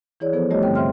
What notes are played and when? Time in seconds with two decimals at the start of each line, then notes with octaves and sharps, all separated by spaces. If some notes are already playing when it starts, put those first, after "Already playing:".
0.20 E3 E4 G#4 C#5 D5
0.33 F3 B3 A4 C5
0.51 G3 A3 F#4 G4 C#5 D#5
0.63 G2 D3 C4 G5
0.75 C3 C5 E5 G5 C6 F6